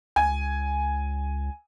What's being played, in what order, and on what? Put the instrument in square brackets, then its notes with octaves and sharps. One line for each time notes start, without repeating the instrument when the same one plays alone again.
[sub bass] C#2 [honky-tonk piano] G#5